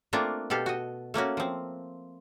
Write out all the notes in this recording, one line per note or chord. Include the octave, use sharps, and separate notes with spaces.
A3 A#3 C4 D4 F4
B2 G4 A4 F5
F#4 D#5
A3 A#3 C#4 F#4
F3 C4